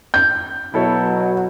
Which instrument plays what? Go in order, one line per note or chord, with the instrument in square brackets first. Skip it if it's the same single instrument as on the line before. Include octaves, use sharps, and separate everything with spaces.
[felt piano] G6
[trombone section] B2 F#3 [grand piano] E4 A4 C#5